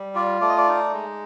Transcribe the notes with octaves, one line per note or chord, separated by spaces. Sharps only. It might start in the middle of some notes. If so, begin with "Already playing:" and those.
Already playing: G3
F4 D5
A3 D5
D#5
D5
D#4
G#3